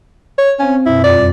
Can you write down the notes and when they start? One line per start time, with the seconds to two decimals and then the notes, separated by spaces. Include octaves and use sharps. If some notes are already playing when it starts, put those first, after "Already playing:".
0.38 C#5
0.59 C4 C#4 C5 F5
0.86 F#2 B2 E4
1.04 F2 F4 D5 D6
1.16 G3